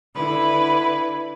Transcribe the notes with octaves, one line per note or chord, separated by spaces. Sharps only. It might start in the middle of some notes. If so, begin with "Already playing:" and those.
D3 E4 B4 B5